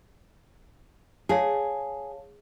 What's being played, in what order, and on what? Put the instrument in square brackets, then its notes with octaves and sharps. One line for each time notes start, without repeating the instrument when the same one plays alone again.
[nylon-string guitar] G#4 [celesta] C#5 F5 A5